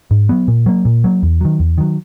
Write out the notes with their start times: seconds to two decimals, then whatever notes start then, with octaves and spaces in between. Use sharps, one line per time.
0.11 G#2
0.29 F#3 B3
0.48 A#2
0.66 F#3 A#3
0.85 A#2
1.04 F#3 A#3
1.23 E2
1.41 D#3 F#3
1.60 E2
1.78 D#3 F#3